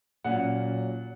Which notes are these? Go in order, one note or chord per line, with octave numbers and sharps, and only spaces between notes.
A#2 F#3 C#4 F#5